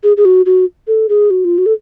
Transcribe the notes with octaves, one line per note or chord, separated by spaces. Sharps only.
G#4
G#4
F#4
F#4
A4
G#4
F#4
F4
F#4
A4